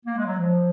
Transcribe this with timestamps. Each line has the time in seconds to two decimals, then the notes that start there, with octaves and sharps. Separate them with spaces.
0.05 A#3
0.17 G#3
0.26 F#3
0.37 F3